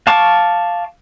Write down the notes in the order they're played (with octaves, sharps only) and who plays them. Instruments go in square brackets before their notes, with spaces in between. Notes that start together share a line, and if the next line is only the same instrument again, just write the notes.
[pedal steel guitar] F5 A5 C#6 D6